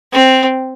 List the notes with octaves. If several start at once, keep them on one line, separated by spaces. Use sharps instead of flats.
C4